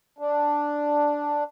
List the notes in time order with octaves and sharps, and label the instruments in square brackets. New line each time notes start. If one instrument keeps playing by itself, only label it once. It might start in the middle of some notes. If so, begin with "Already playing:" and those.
[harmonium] D4